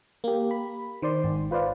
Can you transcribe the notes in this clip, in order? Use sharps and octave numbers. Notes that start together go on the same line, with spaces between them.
A#3 G4
B5
D#3 C5 D5 C6
G#1
F4 B4 C5 D5 F5